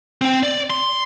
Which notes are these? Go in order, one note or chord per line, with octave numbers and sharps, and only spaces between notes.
C4 G5
D5
C6